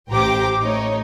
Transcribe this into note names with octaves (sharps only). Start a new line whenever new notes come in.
A1 G4 C5 G5 A#5 D6
A3 D#4 C#5